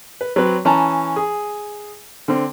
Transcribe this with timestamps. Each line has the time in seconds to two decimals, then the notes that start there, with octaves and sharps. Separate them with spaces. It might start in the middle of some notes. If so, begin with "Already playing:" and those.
0.21 B4
0.36 F#3 C4 B4
0.65 E3 C#4 A5 A#5
1.16 G#4
2.28 D3 C4